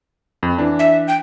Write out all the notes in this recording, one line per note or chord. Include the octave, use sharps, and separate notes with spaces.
F2
E3 D4
E5
G5